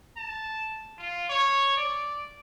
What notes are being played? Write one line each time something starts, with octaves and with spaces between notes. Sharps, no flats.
A5
F4
C#5
D5